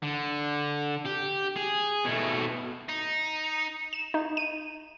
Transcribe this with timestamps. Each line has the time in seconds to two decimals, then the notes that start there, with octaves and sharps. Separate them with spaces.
0.02 D3
1.05 G4
1.56 G#4
2.05 B2 A3
2.89 D#4
3.93 E7
4.14 D#4
4.37 D#7